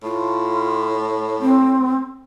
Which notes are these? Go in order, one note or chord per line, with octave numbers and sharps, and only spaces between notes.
A2 F4
C4